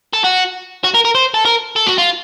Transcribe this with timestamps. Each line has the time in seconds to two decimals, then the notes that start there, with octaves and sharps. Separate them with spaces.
0.14 A4
0.24 F#4
0.84 F#4
0.95 A#4
1.05 A#4
1.15 C5
1.34 A4
1.45 A#4
1.76 A4
1.87 F#4
1.98 F4